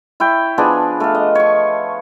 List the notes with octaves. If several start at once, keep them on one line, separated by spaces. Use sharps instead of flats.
E4 C#5 G5
F3 B3 D4 G#4
A3 F5
D#5
C#5 C#6